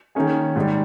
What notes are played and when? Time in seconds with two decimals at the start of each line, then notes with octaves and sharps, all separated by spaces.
0.15 D#3 A#3 C#4 G#4
0.56 G#2 D#3 G3